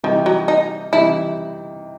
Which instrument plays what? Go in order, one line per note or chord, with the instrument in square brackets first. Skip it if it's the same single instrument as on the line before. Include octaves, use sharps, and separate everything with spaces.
[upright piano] C3 E3 G3 D#4 [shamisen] D#3
[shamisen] F#3
D#4
[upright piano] C3 E3 G3 D#4 [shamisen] E4